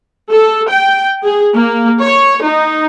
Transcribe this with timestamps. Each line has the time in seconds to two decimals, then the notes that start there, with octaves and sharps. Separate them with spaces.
0.30 A4
0.69 G5
1.24 G#4
1.56 A#3
2.02 C#5
2.43 D#4